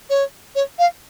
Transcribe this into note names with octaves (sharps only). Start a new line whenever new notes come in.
C#5
C#5
F5